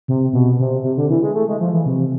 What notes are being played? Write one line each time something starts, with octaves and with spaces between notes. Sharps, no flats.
C3
B2
C3
C3
D3
E3
G#3
A3
G#3
F3
E3
C3